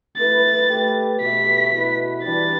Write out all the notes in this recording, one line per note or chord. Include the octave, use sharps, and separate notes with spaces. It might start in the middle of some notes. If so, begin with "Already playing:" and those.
A3 E4 B4 A6
A3 G4 B4
B2 A3 G4 B4 B6
B2 A3 E4 B4
E3 G3 D4 G4 B4 A6